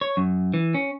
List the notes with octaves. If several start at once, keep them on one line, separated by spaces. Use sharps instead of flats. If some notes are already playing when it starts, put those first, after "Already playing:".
C#5
F#2
E3
C#4